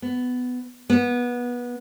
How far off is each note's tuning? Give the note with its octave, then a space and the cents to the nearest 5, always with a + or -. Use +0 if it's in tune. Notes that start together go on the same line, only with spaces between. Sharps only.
B3 +15
B3 -20